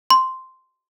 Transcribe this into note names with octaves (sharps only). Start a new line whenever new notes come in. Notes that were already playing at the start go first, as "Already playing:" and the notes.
C6